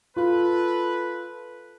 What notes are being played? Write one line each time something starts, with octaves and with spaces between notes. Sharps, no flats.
F4 A4 B4